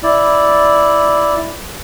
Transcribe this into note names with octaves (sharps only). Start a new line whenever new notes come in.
E4 D5